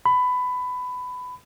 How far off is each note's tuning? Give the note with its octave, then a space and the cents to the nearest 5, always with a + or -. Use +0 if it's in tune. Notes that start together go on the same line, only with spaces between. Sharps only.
B5 +15